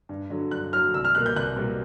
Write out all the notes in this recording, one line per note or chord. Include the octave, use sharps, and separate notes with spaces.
G2
D3 F#3
G2 F#6
D3 F#3 F6
C2 E6
F6
B2 G3 A#3 F#6
G6
C2 F#6
B2 G3 A#3